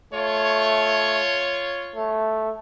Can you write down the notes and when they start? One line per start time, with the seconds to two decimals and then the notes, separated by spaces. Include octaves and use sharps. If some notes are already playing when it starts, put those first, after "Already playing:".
0.13 A3 F4 C#5
1.95 A3